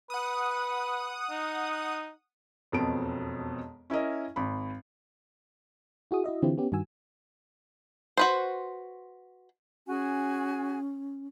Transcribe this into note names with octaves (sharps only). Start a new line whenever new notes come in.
B4 F#5 D#6
D#4
E1 F2 B2 C4 A5 D7
C#4 E4 A#4 D#5
G#1 B5
E4 F#4 G#4 D#6
E4 F#4 D#5 E5
D3 E3 C4 E4 F4 G4
B3 C#4 G4
G2 D#3 F#4 G#5 E6
F#4 B4 C5
C#4 F#4 G#4 G#5